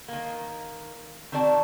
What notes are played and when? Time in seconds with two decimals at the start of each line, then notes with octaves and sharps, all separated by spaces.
0.08 D#3 A#3
1.32 D#3 C4 F#4 D5 A5